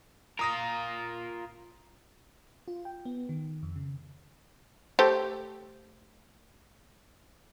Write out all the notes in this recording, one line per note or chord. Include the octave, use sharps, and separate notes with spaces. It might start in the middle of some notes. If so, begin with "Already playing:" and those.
F4 A#4 A#5 D#6 A#6
F4
G5
B3
D#3
F2
C#3
A3 G4 C5